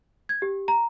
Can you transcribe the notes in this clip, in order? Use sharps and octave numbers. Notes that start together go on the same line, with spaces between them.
G#6
G4
A#5